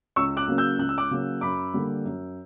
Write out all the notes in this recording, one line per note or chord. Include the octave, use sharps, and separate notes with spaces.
C#2 C#6 E6
D6 F#6
C#3 F#3 A#3 C#4
E6 G6
C#2 F#6
E6
D6 F#6
C#3 F#3 A#3 C#4
F#2 B5 D6
D3 G3 A#3
F#2